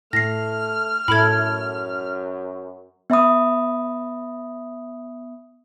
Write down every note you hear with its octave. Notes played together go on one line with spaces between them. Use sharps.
A2 A3 F6 A#6 C7
F#2 A2 E4 A4 B5 G#6
B3 E5 B5 D#6